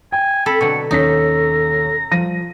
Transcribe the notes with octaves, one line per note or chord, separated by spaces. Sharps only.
G5 G#5
C4 A4 B5
B2 D3 F#3 C#6
D#2 C#4 D#4 A4 A#5 B6
F3 G3 A#6 D#7